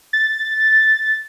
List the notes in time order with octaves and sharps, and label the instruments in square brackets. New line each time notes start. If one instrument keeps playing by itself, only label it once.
[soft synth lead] A6